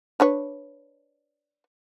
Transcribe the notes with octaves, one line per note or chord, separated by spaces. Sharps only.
D4 B4 C#5